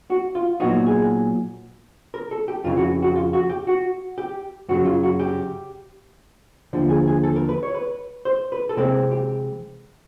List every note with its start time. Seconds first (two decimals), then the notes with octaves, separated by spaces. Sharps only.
0.10 F#4
0.35 F4
0.60 A#2 F#3 B3 D#4 F#4
0.87 G#4
2.14 A#4
2.31 A4
2.48 G4
2.64 F2 C#3 E3 F4
2.77 F#4
3.02 F#4
3.16 F4
3.33 F#4
3.50 G4
3.67 F#4
4.18 G4
4.69 F#2 C#3 F#3 F#4
4.85 F4
5.03 F#4
5.20 G4
6.73 D#2 D3 F3
6.89 G#4
7.08 G#4
7.23 A4
7.36 A#4
7.49 B4
7.63 C#5
7.75 B4
8.25 C5
8.52 B4
8.69 A4
8.77 C3 E3 G#3 C4 A#4
9.11 G4